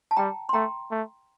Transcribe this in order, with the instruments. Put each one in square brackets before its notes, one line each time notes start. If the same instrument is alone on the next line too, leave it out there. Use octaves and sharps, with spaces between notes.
[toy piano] A5
[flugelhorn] G3 [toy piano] G5 A#5
[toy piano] C6
[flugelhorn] A3 [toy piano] G5 A#5
[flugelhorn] A3